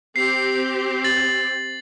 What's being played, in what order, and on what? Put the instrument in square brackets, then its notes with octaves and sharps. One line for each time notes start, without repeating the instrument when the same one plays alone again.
[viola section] C4 G4 [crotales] C7
[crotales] A6 F#7